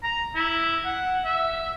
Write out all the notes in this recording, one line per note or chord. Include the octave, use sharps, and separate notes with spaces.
A#5
E4
F#5
E5